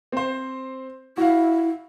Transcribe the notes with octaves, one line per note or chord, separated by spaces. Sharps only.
C4 C5
E4 F#4 F5